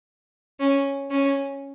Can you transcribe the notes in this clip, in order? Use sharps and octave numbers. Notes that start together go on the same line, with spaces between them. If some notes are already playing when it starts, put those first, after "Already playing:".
C#4
C#4